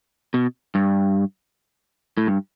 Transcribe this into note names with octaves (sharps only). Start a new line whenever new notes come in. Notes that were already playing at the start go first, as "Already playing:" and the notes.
B2
G2
A2
G2